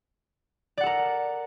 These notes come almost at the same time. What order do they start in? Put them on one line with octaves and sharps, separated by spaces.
D5 F#5 A4 A#4